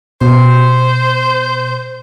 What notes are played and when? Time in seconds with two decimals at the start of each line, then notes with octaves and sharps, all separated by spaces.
0.21 B2 C5